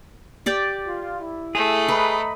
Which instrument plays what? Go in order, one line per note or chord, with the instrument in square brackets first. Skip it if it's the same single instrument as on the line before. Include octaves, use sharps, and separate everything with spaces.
[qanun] G4 D5 G5
[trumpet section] F4
E4
[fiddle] A3 [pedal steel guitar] G#4
[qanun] B4 [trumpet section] D#5 A#5 B5